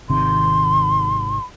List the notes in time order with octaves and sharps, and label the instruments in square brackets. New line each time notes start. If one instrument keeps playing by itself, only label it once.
[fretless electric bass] G#1 C3 D#3 [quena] C6